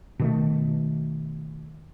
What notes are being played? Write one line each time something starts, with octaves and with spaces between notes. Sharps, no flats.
B2 D#3 A3